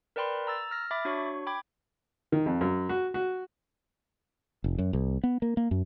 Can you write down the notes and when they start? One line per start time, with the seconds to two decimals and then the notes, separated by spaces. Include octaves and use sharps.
0.16 A#4 B4 D5 G5 B5 C6
0.47 A#5 E6 A6
0.71 F6 A#6
0.91 E5 B5 D6 A6
1.05 D4 F#4 C#5 C#6
1.47 G5 B5 D6 G#6
2.32 D#3
2.46 F2
2.61 F#2
2.89 F#4
3.14 F#4
4.64 F1
4.78 F#2
4.93 C2
5.24 B3
5.42 A#3
5.57 A#3
5.71 F#2